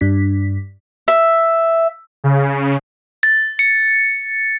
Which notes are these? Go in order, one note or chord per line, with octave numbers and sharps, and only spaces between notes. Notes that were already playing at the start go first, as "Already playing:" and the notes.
G2 D4 B6
E5
C#3
A6
C#7